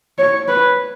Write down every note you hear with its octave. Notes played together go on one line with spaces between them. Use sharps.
C#5
B4